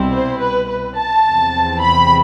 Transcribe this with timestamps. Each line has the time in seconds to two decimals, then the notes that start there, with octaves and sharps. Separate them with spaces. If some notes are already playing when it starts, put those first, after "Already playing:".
Already playing: C2 B2 G3 C4 E4
0.13 C5
0.41 B4
0.69 B4
0.96 A5
1.25 E2 C3 F3 C4
1.82 B5